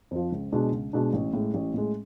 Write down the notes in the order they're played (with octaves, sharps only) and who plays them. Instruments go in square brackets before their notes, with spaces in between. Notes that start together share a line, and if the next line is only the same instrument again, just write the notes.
[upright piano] F2 F3
C#2
B2 G#3 D4
C#2
B2 G#3 D4
A1
A2 G#3
A1
A2 G#3